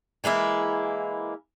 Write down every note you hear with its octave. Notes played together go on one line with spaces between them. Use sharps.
E3 G#3 A#3 E4